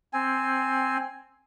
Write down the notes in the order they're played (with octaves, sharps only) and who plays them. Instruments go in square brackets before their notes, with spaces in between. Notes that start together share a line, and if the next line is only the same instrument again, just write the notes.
[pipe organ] C4 [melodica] G#5